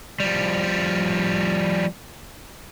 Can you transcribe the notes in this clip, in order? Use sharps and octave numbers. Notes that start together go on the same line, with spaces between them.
F3 G3